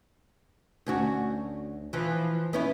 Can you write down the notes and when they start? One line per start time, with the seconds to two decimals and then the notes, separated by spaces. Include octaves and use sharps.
0.86 D2 C#4 F#4
1.93 E3 F3
2.53 B3 C#4 E4